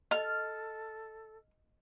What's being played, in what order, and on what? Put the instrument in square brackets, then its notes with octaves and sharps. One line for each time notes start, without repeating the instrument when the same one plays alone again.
[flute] A4 [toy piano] D#5 [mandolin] F6